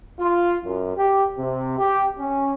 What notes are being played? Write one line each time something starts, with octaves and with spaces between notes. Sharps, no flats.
F4
F#2
G4
C3
G4
C#4